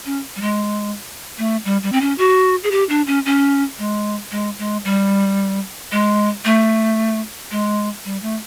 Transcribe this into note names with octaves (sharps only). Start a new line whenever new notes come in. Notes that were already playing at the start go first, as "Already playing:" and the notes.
C#4
G3
G#3
A3
G3
G3
C4
C#4
F#4
G#4
G4
D4
C#4
C#4
G#3
G#3
G#3
G3
G#3
A3
G#3
G3
A3